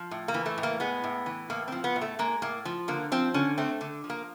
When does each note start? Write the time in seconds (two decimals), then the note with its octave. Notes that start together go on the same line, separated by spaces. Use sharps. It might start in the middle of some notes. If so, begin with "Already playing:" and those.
Already playing: F3
0.11 A2
0.28 A#3
0.34 E3
0.46 A3
0.58 A2
0.63 A#3
0.80 G#3 B3
1.04 A2
1.26 E3
1.50 A2 A#3
1.68 F3 C4
1.84 B3
1.96 A2
2.01 A3
2.19 G#3 A#3
2.42 A2 A#3
2.65 F3
2.88 D3 A#3
3.12 F3 C4
3.34 D3 C#4
3.58 A3 C4
3.81 D3
4.04 F3
4.10 A#3